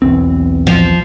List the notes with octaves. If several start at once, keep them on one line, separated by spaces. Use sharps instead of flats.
B1 E2 C4
F3